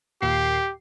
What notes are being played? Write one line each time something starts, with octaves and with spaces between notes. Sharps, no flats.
D#2 A#2 G4 C7